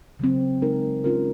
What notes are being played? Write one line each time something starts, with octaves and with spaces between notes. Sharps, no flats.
C#3 F#3 C4
G#3 D#4 A#4
G#3 C#4 F4 A#4